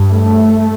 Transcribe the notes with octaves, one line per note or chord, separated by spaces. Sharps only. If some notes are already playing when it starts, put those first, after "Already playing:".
Already playing: G2
A3